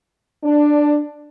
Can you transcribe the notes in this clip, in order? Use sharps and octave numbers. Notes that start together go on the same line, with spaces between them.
D4